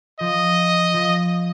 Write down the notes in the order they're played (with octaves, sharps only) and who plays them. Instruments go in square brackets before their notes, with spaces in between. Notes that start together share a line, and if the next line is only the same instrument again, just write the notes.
[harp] F3 [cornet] D#5
[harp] F3